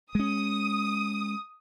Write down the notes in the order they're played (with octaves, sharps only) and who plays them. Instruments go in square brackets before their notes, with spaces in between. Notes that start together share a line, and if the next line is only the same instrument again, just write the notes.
[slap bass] G#3 C#4 [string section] D#6